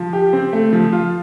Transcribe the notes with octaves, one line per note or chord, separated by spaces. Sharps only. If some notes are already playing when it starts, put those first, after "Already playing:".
Already playing: F3
G4
C4
A3
F3
F4